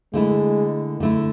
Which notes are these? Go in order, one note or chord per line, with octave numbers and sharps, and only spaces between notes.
D3 G#3 A3 E4
D3 A3 E4